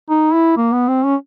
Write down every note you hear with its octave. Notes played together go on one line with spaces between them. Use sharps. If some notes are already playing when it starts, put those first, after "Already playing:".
D#4
E4
A#3
B3
C4
C#4